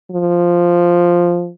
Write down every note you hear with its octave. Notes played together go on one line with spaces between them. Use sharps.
F3